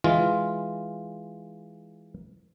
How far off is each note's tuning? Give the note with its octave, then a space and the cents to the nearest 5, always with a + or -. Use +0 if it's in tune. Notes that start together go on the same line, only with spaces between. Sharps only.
E3 +0 G#3 +0 F4 +0